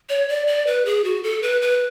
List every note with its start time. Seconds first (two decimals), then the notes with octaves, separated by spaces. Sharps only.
0.09 C#5
0.29 D5
0.47 D5
0.67 B4
0.85 G#4
1.04 F#4
1.23 A4
1.42 B4
1.62 B4